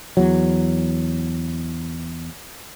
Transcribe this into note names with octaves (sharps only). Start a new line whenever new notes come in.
E2 F#3